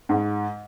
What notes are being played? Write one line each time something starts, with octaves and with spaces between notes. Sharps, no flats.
G#2